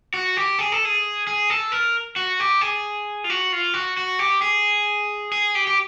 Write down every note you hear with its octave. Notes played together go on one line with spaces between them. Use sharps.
F#4
G4
G#4
A4
G#4
G#4
A4
A#4
F#4
G4
G#4
F4
F#4
F4
F#4
F#4
G4
G#4
G#4
G4
G4